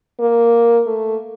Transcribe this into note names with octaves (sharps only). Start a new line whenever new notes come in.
A#3
A3